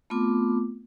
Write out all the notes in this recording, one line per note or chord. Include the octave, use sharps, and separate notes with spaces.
A3 B3 C4 F4 D6